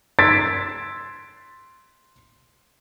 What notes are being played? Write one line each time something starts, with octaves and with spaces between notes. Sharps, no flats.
C6 E6 G#6 A6 B6 D7